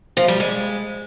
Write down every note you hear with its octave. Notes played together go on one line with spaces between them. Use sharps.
F3
G3
G#3